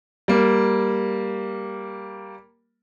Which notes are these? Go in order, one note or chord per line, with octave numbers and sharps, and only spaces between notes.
G3 A#3